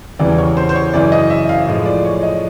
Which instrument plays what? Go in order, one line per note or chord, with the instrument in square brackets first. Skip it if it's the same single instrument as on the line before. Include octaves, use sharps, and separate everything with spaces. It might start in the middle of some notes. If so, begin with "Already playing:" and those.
[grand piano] E2 C#3 E3 G3 D5
C#5
C5
C5
C#5
F#2 C#3 E3 D5
D#5
E5
F5
A2 F3 G#3
D5
C#5
D#5